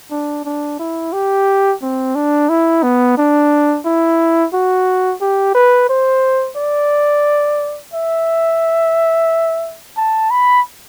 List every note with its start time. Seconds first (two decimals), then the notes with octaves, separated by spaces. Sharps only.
0.11 D4
0.45 D4
0.79 E4
1.13 G4
1.82 C4
2.16 D4
2.50 E4
2.83 B3
3.18 D4
3.85 E4
4.54 F#4
5.21 G4
5.55 B4
5.89 C5
6.57 D5
7.94 E5
9.97 A5
10.31 B5